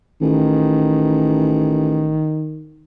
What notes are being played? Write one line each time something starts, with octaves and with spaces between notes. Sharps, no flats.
A1 D#3